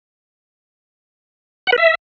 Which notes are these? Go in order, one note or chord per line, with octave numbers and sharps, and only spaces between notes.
F#5
B4
E5